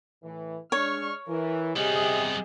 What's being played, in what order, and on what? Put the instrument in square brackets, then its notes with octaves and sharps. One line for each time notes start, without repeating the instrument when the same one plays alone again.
[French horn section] A2 E3
[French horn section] G#3 D4 [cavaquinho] C#5 [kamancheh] C#6 F6
[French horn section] E3 [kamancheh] A#4
[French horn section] C3 [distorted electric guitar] G3 B3 [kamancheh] G#4 D#5